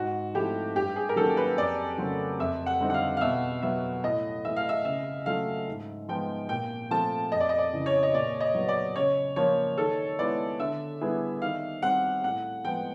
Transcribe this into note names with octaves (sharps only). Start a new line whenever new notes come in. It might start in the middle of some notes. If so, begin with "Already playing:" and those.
Already playing: G#2 F#4
F3 A3 C4 E4 G4
G2 G4
G#4
A#4
D#3 F#3 A#3 C#4 A4
B4
F2 D5
C#3 F#3 A3 C4
F2 E5
F#5
D3 G3 C4 D#4
F#5
F5
F5
B2 E5
F#3 B3 E5
A2 D#5
E3 A3 E5
F5
E5
C#3 E5
F#3 A3 C#4 F4 F5
G#2
F3 G#3 B3 G5
A#2 G5
F3 A3 C4 F4 A5
F2 D#5
D5
D#5
D5
C#3 E3
C#5
D#5
A#2 D5
D#5
F#3 B3
D5
C#3 C#5
F3 A#3 C#5
D#3 A4
G#3 B3 E4 D5
D3 E5
G3 B3 E4 G#4
D#3 F5
G3 C4 F#5
A2 F#5
F3 G#3 B3 G5